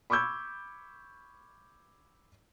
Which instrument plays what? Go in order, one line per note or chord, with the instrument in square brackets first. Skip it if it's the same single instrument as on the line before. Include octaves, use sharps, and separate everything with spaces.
[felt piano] B5 C#6 D6 E6 G6 G#6